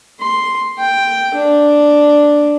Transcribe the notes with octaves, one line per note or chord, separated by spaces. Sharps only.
C6
G5
D4